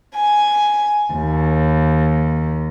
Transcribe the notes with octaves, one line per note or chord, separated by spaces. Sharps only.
G#5
D#2